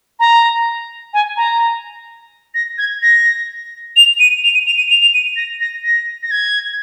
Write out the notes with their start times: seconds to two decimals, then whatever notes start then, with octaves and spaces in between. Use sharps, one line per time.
0.20 A#5
1.14 G#5
1.37 A#5
2.55 A#6
2.78 G#6
3.03 A#6
3.96 F7
4.20 D#7
4.44 F7
4.54 D#7
4.67 F7
4.78 D#7
4.90 F7
5.02 F7
5.14 D#7
5.36 A#6
5.61 A#6
5.84 A#6
6.23 A#6
6.31 G#6